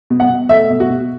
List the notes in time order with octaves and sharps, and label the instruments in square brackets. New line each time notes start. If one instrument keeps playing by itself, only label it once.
[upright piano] B2
F#5
B2
A3 E5
B2
F#4
B2